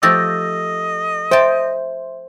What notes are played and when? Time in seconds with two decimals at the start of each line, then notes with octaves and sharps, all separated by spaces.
0.03 F3 A3 G4 D#5 E6 A6 A#6
1.31 C5 E5 G5 A5